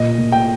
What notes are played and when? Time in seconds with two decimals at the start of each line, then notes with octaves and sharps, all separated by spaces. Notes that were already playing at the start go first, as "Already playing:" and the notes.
Already playing: A#2 D#5
0.18 A#2
0.32 G5